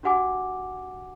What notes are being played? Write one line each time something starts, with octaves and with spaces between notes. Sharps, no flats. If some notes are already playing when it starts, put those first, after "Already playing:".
D4 F#4 G4 F#5 G#5 D6